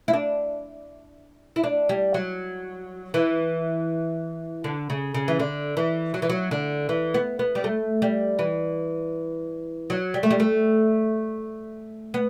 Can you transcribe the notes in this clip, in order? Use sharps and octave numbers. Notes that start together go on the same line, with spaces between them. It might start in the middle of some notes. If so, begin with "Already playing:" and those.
E4
D4
E4
D4
G3
F#3
E3
D3
C#3
C#3
E3
D3
E3
F#3
E3
F#3
D3
E3
B3
B3
G3
A3
G3
E3
F#3
G3
A3
G3
A3
B3